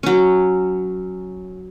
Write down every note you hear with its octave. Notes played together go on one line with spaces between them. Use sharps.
F#3 C#4